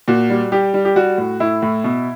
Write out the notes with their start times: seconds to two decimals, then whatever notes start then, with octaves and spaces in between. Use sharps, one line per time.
0.08 A#2 F#4
0.30 G3
0.52 G3 G4
0.74 G3
0.85 G4
0.96 G3 F#4
1.18 A2
1.40 A2 E4
1.62 A2
1.84 B2